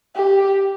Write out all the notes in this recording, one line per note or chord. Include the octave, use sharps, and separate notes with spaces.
G4